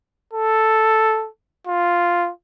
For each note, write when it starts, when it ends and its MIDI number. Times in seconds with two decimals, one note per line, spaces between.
0.33 1.28 69
1.67 2.30 65